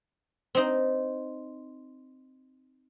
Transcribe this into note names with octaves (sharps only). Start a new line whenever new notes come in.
C4 D#4